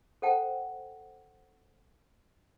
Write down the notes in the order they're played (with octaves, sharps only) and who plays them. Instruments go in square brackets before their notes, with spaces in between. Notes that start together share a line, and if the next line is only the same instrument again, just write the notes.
[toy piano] A4 C5 F#5 G5 A5